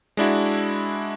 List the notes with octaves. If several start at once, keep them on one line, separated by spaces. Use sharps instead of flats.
G#3 D4 E4 F#4